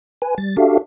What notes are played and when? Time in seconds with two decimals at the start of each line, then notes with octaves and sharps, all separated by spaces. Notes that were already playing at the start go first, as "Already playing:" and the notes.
0.22 B4 G#5
0.38 G3 A6
0.57 D4 F#4 G4 A4 E5 F5